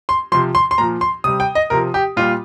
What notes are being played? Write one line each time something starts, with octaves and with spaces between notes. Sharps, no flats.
C6
C3 F3 C6
C6
C6
A#2 F3 A#5
C6
C3 G3 D#6
G5
D#5
C3 F3 A#4
G4
A#2 G3 F4